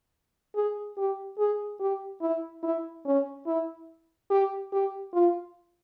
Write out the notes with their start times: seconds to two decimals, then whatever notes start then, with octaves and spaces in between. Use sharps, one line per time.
0.55 G#4
0.98 G4
1.39 G#4
1.80 G4
2.21 E4
2.63 E4
3.05 C#4
3.47 E4
4.30 G4
4.72 G4
5.14 F4